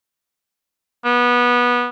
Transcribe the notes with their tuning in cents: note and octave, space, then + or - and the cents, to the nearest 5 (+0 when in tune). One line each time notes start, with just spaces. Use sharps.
B3 -20